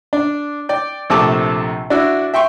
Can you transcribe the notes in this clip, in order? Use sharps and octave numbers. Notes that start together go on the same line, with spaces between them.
D4
D5 G5
A#1 C3 A3 A5 D6
D4 E4 F#4
E5 G5 C6 C#6